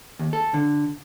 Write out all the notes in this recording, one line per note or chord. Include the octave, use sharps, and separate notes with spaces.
D#2
A4
D3